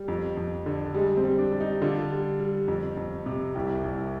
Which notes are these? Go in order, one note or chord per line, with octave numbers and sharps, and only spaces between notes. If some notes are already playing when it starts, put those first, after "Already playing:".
Already playing: G3
F2
F2
D3
G3 G#3
C4
G3
D4
G3
D#4
D3 F4
G3
G3
F2
F2
C3
C2 G4
C2